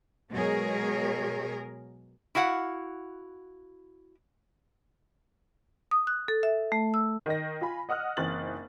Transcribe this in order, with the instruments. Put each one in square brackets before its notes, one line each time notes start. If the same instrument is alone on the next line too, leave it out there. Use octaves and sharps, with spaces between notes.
[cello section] B2 F#3 G#3 G#4 A#4 C#5
[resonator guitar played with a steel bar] E4 F#4 F5 F#5
[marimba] D#6
F#6
A4
E5
A3
E6
[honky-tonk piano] D#3 D#5 A#6
F4 G#5 B5
D#5 F#5 D#6 F6 F#6
F#1 E3 C4 D#4 A6 F#7